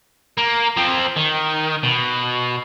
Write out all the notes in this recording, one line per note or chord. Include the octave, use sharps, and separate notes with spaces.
A#3
F3 C4
D#3
B2